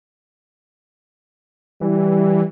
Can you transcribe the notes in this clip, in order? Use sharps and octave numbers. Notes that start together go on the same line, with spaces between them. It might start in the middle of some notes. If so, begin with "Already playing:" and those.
E3 G3